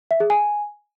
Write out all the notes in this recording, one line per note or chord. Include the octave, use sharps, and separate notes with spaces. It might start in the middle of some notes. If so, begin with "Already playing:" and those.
E5
G#4
G#5